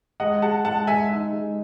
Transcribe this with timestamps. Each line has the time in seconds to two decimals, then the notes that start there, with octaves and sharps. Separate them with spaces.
0.20 G#3 D#5 F#5
0.42 G#4 F#5 A5
0.65 G#3 F#5 A5
0.87 G#3 E5 G#5
1.10 D#4
1.32 G#3